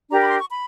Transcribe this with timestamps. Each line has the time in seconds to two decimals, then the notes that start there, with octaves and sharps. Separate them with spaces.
0.09 D4 G4 A#4 A#5
0.19 B5
0.29 C6
0.39 C#6
0.49 B5